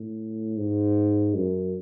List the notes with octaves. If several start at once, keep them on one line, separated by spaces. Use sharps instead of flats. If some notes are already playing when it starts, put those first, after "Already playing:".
Already playing: A2
G#2
F#2